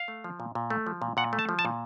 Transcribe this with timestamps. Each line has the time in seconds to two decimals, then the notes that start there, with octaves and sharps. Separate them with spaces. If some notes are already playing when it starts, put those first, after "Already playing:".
Already playing: F5
0.08 A3
0.24 F3
0.40 A#2
0.55 A#2
0.70 A3
0.87 F3
1.02 A#2
1.17 A#2 F#5
1.33 A3
1.39 A5
1.49 F3
1.59 A5
1.65 A#2